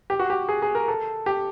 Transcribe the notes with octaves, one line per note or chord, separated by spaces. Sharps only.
G4
F#4
G4
G#4
G#4
A#4
A4
G4